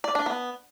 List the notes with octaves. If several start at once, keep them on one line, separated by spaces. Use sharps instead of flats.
D5
D4
B3